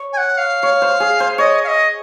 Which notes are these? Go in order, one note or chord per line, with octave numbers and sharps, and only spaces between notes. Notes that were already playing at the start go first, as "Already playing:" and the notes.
Already playing: C#5
G#5
F#5
F5
C#5
C5
G#4
C5
C#5 D#5
F5
D#5